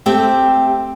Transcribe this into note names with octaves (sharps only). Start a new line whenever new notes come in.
A3 C4 G4 E5 G5